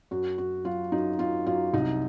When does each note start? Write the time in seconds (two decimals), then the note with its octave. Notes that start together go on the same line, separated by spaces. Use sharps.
0.11 F#2 F#4
0.38 F#2 F#4
0.65 F#3 F4
0.92 F#2 D#4
1.19 F#2 F4
1.46 F#2 F4
1.73 C2 D#4